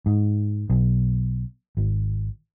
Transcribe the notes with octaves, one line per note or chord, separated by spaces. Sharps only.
G#2
B1
G#1